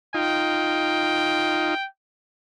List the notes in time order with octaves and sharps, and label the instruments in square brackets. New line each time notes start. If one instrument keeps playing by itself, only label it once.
[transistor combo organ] D#4 F4 [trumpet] G5